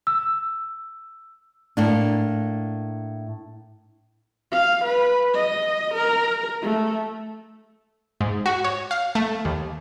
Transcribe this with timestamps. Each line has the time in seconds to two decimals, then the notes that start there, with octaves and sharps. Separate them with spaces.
0.07 E6
1.77 A2 A#3 D4
4.52 F5
4.84 B4
5.34 D#5
5.94 A#4
6.62 A3
8.21 G#2
8.46 F#4
8.64 C#5
8.91 F5
9.15 A3
9.45 D#2